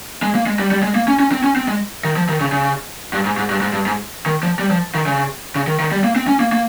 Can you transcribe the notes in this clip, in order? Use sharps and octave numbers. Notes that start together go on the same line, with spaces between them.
G#3
A#3
G#3
G3
G3
G#3
A#3
C#4
C#4
C4
C#4
C4
G#3
D#3
F3
D#3
C#3
C#3
G2
G#2
G#2
G2
G#2
G2
G#2
D#3
F3
G3
F3
D#3
C#3
C#3
D#3
D#3
G3
A#3
C4
C#4
A#3
A#3